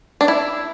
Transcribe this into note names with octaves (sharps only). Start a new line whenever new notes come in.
D4
E4